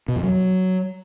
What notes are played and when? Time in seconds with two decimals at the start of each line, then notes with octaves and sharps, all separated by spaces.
0.08 B2
0.16 F2
0.24 F#3